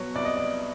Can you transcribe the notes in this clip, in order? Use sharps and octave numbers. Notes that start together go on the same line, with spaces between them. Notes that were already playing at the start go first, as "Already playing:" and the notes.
Already playing: B2 F#3 C#5
C2 D5
D#5
D5